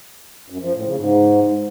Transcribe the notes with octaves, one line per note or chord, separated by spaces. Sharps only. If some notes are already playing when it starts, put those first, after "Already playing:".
F#2
F3
A2
C#3
G#2